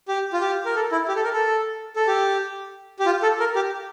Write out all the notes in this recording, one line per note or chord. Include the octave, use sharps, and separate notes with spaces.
G4
F4
G4
A#4
A4
E4
G4
A4
A#4
A4
A4
G4
G4
F4
A4
A#4
G4